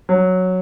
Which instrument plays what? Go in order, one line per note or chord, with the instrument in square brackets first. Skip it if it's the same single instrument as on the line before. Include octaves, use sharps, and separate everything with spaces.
[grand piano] F#3